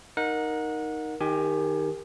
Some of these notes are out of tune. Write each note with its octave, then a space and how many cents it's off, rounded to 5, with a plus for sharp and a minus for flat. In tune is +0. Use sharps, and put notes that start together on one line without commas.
D#4 +0 A#4 +0 F#5 -25
D#3 +0 G4 +20 G#5 +15